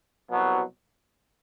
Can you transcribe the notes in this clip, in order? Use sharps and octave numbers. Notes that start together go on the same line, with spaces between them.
C2 B2 F#3